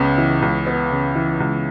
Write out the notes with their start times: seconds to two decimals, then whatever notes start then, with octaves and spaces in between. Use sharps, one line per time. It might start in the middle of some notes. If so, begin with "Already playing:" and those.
Already playing: C#2 C#3 B3
0.18 E3
0.42 C#2
0.67 B3
0.91 C#3
1.15 E3
1.40 C#2